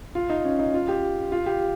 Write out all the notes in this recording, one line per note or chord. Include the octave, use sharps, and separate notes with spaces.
F4
D#4
C#4
D#4
F4
G4
F4
G4